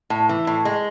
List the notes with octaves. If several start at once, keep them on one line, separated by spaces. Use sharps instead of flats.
A2
E3
A2
G#3